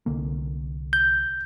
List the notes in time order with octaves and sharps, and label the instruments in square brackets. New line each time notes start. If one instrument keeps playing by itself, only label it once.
[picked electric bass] C2 D3 A#3
[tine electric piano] G6